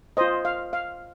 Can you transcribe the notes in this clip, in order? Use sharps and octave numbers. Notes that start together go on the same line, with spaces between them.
F4 C5 D#5
F5
F5